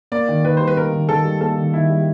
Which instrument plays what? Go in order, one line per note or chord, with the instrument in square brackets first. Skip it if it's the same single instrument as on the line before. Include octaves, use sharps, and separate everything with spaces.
[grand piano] A#3 [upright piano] D5
[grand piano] D#3
[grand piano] D#3 [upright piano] B4
[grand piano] G3 [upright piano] C5
[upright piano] B4
[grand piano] A#3 [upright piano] A#4
[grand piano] D#3
[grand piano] D#3 [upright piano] A4
[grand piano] G3
[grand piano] A#3 [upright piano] A4
[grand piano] D#3
[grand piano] D#3 [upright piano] E4
[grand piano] G3